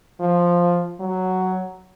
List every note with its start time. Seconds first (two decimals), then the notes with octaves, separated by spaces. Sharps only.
0.20 F3
1.00 F#3